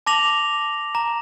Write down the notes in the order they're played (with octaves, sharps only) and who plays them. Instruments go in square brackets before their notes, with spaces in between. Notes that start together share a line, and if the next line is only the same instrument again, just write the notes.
[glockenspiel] A5 D6 A#6 F7 F#7
A#5